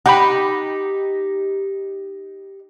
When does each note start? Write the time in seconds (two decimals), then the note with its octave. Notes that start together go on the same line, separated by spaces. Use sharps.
0.06 D#4 G4 F#5 G5 B5